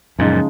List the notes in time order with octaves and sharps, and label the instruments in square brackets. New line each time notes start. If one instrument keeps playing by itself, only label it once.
[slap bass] F#2 A#2 [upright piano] C#3 F3 G#3 D#4